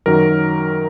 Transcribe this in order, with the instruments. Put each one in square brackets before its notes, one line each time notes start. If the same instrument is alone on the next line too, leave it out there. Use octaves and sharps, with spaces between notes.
[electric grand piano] F#2 D#3 F#3 A#4